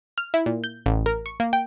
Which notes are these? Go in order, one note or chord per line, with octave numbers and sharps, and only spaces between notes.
F6
E4
A#2
G6
A1
A#4
C#6
A#3
G5